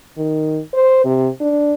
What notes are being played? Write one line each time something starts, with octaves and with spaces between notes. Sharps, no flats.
D#3
C5
C3
D4